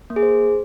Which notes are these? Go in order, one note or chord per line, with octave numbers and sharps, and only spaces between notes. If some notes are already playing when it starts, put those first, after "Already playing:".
A#3
G#4
C5